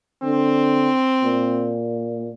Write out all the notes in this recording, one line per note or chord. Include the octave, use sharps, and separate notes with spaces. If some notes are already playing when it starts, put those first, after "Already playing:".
D3 C4
A#2